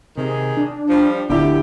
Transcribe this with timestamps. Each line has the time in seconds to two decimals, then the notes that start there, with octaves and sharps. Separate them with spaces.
0.17 C3 D#3 G#4
0.57 D4
0.89 F3 G3
1.30 D1 D3 E4 G4